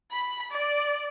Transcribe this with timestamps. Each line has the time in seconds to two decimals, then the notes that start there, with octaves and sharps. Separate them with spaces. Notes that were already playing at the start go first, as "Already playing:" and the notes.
0.12 B5
0.51 D5